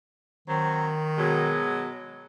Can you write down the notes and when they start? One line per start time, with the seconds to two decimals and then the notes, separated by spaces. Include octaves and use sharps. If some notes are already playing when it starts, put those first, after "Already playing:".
0.48 D#3 F#3 C4
1.17 B2 F#3 G#3